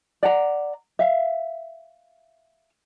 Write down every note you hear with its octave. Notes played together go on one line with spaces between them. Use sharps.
D5 F#5 A#5
E5 F5